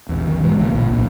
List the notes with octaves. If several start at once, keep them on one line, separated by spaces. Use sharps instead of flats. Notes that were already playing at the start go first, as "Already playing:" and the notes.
A#1 E2
D#3 E3
G#2 C3 E3 G#3
B1 C#3 F#3 A#3
A#1 A#2
C2 A#2